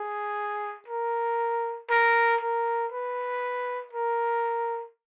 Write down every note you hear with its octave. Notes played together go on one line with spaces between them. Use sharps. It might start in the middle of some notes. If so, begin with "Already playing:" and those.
Already playing: G#4
A#4
A#4
A#4
B4
A#4